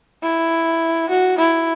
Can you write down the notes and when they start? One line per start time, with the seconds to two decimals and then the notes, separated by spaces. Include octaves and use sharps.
0.23 E4
1.09 F#4
1.38 E4